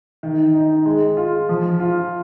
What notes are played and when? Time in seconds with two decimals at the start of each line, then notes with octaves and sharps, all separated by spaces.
0.23 D#3
0.54 D#4
0.86 G#3
1.17 F4
1.49 F3
1.80 F4